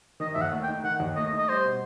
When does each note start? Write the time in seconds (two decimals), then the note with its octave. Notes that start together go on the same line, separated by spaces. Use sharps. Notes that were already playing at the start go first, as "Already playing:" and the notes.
0.20 D#3 D#5
0.34 D#2 E5
0.42 F#5
0.52 A3
0.63 G5
0.68 D#4
0.84 D#3 F#5
1.00 D#2
1.16 A3 D#5
1.32 D#4
1.38 D#5
1.49 G3 C5
1.64 B2